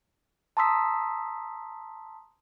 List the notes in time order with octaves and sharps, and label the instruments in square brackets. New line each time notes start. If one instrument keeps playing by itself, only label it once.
[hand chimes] A5 A#5 C6 D#6 E6 B6